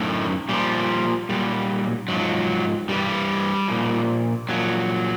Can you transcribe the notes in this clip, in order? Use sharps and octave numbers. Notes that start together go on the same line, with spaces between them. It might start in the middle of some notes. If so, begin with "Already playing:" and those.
Already playing: F#2 A2 D#3 F#3 A3
A#2 F3 G3
A#2 F#3 G3
G#2 F3 F#3
G2 E3 G3
A#2 F3
A#2 F3 F#3